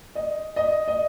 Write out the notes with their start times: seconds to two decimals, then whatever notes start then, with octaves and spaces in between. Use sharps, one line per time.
0.15 D#5
0.56 D#5
0.88 D#5